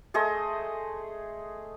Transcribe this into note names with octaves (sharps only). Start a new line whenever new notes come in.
A3 G#4 C5 D#5